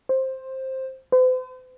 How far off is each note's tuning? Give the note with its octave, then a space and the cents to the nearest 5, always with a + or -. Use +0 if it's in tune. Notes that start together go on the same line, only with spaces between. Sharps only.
C5 +10
C5 -45